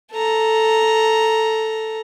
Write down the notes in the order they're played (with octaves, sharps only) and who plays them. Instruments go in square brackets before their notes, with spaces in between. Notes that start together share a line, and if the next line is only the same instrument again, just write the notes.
[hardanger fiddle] A4 A#5